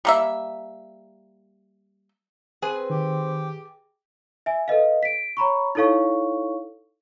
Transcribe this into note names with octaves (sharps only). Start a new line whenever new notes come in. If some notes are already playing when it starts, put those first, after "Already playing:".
G3 A#3 E5
C4 G#4 B4 G#5
D#3 G4
E5 G#5
A4 B4 D#5 F5
B6 D7
C#5 A#5 B5 C#6
D#4 E4 A4 C#5 F5 C#6